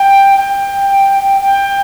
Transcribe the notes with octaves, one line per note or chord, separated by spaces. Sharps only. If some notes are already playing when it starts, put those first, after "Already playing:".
Already playing: G5
G5
G5
G5